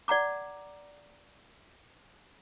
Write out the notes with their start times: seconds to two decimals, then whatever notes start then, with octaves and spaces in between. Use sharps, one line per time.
0.08 D5 F#5 A#5 D6